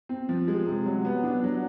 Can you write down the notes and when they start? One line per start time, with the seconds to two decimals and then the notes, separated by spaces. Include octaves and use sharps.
0.09 C4
0.29 F3
0.48 G#3
0.67 C3
0.86 F#3
1.05 B3
1.24 D4
1.44 F#3